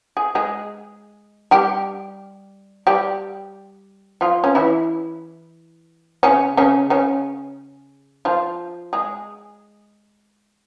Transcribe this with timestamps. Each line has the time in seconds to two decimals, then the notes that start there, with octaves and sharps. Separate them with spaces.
0.17 G#4
0.35 G#3 G#4
1.51 G3 G4
2.87 G3 G4
4.21 F3 F4
4.44 C#4
4.55 E3 E4
6.23 C#3 C#4
6.57 C#3 C#4
6.90 C#3 C#4
8.25 F3 F4
8.93 G#3 G#4